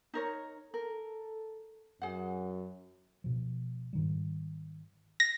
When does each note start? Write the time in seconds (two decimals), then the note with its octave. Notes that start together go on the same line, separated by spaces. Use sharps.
0.14 D#4 A#4 C#5
0.74 A4 A#4
2.02 F#2 G#4 F#5
3.24 B2 F3
3.93 G#2 D#3 G3
5.20 A#6